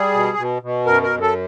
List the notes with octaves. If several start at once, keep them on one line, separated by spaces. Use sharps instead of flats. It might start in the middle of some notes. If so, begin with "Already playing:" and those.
Already playing: G3 G#4
B2
B2
B2
F#2 A#4
A#4
F#2
A4